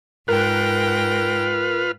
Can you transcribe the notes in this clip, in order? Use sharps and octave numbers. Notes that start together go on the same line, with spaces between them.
G#2 F4 A#4 B4 G5 F6 F#6 A#6